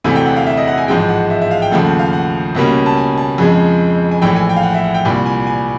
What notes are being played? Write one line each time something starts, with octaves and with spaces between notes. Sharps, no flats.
E1 D2 C3 E3 A3 G#5
G5
F#5
F5
E5
D#5
F#5
G#5
A1 G#2 F3 G#3 G5
F#5
E5
E5
F5
G5
D#2 C#3 F3 A3 F#5
F#5
F5
F#5
C#2 B2 G3 A#3 C#4
A5
G#5
A5
F2 C#3 F3 G#3 G#5
G#5
A#1 A2 E3 G5
G#5
G5
F5
F#5
E5
F#5
G5
C2 A#2 G3 G#5
G#5
G#5